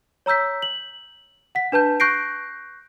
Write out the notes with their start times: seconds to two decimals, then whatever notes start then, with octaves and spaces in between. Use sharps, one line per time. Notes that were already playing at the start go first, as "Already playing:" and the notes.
0.26 C#5 A#5 E6 G6 B6
0.62 F#7
1.55 F#5 B6
1.72 D4 B4 A5 G6
2.00 C#6 F#6 G6 A#6 C7 D7